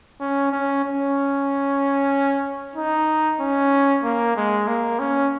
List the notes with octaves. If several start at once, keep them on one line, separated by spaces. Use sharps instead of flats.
C#4
C#4
C#4
D#4
C#4
A#3
G#3
A#3
C#4